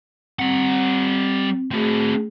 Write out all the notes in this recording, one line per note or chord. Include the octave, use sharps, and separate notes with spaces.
G3 C4 F#5
A3 C4 F#4 G#4